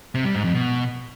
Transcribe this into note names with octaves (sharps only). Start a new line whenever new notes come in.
C3
G3
G#2
F2
B2